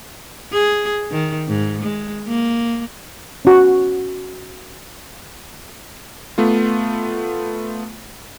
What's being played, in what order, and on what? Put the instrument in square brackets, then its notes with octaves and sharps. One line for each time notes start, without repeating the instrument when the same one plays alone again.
[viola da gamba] G#4
D#3
G#2
G#3
A#3
[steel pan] C#4 F#4
[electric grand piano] A3 B3 F4